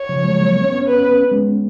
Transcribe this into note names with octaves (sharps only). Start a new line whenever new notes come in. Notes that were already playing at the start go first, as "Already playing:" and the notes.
Already playing: C#5
C#3 F3
F3 G#3
F#3 A#3
B3
C#4
B3
C#4
B3 B4
C#4
B3
C#4
B3
C#4
G#3 B3